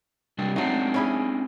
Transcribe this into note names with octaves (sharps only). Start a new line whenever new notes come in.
C3 G3 D4
F#3 A3 C4 D4 D#4
C#4 E4 G#4